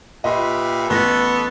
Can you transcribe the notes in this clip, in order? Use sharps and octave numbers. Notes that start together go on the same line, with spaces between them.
A#2 G4 B4 D#5 E5 C6
A1 B3 A4 C6 C#6 A#6